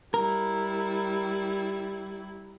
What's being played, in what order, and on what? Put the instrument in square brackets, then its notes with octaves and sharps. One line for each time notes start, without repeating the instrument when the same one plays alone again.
[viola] G3 E4 [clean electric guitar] A#4